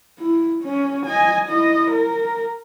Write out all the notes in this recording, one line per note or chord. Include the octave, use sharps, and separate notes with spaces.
E4
C#4
D#5 G#5
E4 D#5
A#4